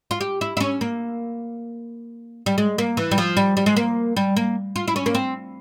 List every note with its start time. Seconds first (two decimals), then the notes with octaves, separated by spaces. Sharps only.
0.11 F4
0.21 G4
0.41 E4
0.57 E4
0.60 C#4
0.81 A#3
2.46 G3
2.58 G#3
2.78 A#3
2.97 E3
3.11 G3
3.18 F3
3.37 G3
3.57 G3
3.66 G#3
3.76 A#3
4.17 G3
4.37 A#3
4.76 F4
4.88 E4
4.96 C#4
5.06 A#3
5.15 C4